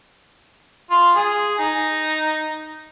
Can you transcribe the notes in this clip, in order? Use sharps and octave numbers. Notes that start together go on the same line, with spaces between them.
F4
G#4
D#4